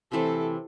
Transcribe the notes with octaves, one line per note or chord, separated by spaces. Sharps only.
C3 E3 A3 C4 A4